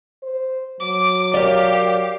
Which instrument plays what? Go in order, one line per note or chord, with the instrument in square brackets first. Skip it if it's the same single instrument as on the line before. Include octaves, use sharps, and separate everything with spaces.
[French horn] C5
[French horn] F#3 [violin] D6
[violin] G4 [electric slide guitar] A#4 C#5 D5 [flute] F5